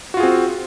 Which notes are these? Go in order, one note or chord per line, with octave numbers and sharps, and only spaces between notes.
C4 F4 F#4 G#4